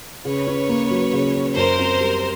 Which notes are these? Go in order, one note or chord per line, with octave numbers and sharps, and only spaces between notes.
C#3 B4 C#5
C#4
A#3
F#3
C#3
C#4
F#2 A#4 C5
C4
G3